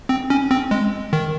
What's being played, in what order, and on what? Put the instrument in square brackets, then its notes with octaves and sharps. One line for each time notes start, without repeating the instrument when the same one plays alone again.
[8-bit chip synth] C4
C#4
C4
G#3
D#3